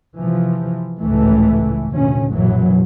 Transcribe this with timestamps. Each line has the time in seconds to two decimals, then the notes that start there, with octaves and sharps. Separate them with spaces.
0.19 C3 E3 F3
1.01 G#1 C#2 A2 E3 A3
1.88 F1 D2 A#2 C#4
2.30 A#1 F#2 B2 E3 F#3